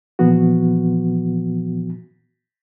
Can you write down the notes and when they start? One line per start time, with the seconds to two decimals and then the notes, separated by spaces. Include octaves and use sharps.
0.19 A#2 E3 F3 B3 F#4